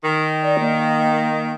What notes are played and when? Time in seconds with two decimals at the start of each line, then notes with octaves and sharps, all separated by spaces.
0.04 D#3
0.43 D5
0.60 A#3